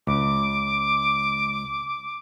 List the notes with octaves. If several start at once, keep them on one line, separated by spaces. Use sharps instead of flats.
C#2 D6